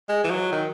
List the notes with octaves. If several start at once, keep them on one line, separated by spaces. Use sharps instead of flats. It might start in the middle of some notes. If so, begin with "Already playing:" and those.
G#3
E3
F#3
D#3